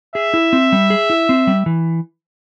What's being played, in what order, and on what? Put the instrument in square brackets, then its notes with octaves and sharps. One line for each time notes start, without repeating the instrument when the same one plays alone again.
[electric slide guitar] G#4 [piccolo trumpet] E5
[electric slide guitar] E4
C4
G3
G#4
E4
C4
G3
E3